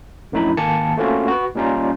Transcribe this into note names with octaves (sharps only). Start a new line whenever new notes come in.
A#1 F#2 A2 D#4 E4 B5
G#1 D#3 A#3 G#5 A5 C#7
A3 A#3 C4 C#4 F4 F#4
F#4 B4
A#2 G3 C#4 D#4 F4